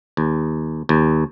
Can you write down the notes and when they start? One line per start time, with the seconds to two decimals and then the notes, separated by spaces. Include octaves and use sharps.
0.17 D#2
0.89 D#2